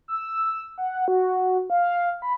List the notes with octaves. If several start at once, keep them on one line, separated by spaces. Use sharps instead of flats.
E6
F#5
F#4
F5
B5